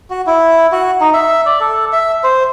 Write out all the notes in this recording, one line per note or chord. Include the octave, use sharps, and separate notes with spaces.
F#4
E4
F#4
D#4
E5
D5
A4
E5
C5